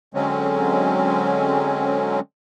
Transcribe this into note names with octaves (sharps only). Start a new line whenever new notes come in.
D3 F#3 G#3 C4 C#4